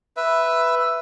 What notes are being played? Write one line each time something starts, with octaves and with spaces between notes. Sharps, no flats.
B4 E5